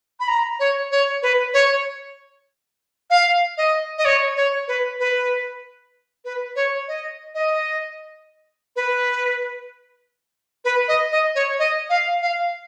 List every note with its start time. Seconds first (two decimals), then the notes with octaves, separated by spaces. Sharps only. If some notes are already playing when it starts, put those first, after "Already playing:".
0.20 B5
0.28 A#5
0.60 C#5
0.91 C#5
1.23 B4
1.54 C#5
3.10 F5
3.57 D#5
3.98 D#5
4.05 C#5
4.36 C#5
4.68 B4
5.00 B4
6.25 B4
6.56 C#5
6.88 D#5
7.35 D#5
8.76 B4
10.65 B4
10.88 D#5
11.12 D#5
11.35 C#5
11.59 D#5
11.90 F5
12.22 F5